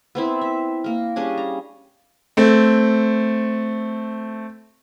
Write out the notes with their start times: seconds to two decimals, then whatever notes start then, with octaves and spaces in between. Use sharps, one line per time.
0.15 B3 C4 E4
0.41 E5
0.84 A#3 A#4
1.16 G3 C#4 D4 G#4
1.37 A#5
2.37 A3 C4